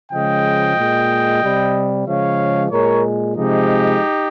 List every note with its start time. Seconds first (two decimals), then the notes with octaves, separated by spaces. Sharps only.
0.12 C#3 F3 G#3 D#5 G5
0.77 A#2 G#3
1.42 C3 G3
2.06 C#3 F3 G#3 C#5 F5
2.71 A#2 G#3 A#4 C#5
3.35 C3 F3 G#3 D#4 G4